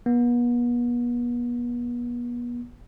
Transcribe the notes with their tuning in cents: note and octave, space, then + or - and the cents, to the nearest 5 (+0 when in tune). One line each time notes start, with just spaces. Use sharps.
B3 -40